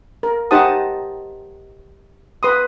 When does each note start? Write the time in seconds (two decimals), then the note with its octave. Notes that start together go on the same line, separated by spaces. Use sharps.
0.23 A#4
0.51 D#4 G4 C5 F#5 A5 D#6
2.43 B4 C6 D#6